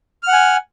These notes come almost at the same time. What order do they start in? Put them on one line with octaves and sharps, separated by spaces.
F6 F#5 G#5